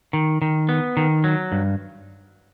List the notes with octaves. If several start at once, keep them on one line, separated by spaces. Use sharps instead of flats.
D#3
D#3
B3
D#3
F#3
G2